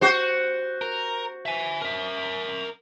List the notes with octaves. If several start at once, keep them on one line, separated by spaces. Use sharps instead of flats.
F#4 C5
A#4
E5 G#5
A#4 E5